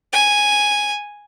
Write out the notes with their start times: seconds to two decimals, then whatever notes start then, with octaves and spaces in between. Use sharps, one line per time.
0.13 G#5